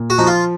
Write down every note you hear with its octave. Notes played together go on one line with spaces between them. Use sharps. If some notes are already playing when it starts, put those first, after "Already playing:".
Already playing: A#2
F#4
F3 D#4
F4